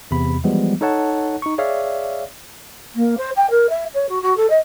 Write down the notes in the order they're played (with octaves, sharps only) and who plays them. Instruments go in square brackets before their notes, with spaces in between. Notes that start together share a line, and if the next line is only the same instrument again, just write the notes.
[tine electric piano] E2 C3 B5
E3 F3 G3 G#3 B3
D#4 A4 C#5 F#5 A5
D#4 C#6
G#4 C#5 D5 E5 F5
[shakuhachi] A#3
C5
G5
A#4
E5
C#5
F#4
F#4
A4
D#5